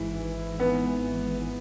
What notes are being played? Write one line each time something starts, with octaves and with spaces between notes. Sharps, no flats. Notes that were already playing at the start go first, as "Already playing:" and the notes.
Already playing: G#1 G#2 E3 E4
B3